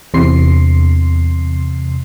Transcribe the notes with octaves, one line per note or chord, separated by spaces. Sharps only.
E2 C3 C6 C7